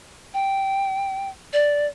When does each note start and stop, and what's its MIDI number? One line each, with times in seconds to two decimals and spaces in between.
0.34 1.29 79
1.53 1.86 74